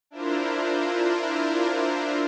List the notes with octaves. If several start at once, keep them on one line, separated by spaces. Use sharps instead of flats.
D4 E4 F4 A#4 C5